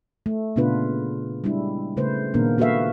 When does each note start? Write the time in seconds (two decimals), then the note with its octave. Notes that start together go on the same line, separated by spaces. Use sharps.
0.26 A3
0.56 A#2 C#3 B3 D4 F4 B4
1.44 G3 G#3 D4 E4
1.97 C#3 A3 B4 C5
2.34 A#2 D#3 A#3 B3 D4 A#4
2.58 A#3 F#4 A4 B4 E5 F5